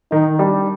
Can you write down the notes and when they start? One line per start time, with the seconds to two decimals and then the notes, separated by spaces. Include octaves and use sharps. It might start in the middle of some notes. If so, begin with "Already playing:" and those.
0.12 D#3 D#4
0.39 G3 D4